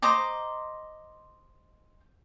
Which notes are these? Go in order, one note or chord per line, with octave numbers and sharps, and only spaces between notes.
C5 D#5 A#5 D6